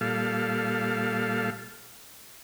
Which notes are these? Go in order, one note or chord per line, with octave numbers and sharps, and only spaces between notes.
A#2 G3 A4 F5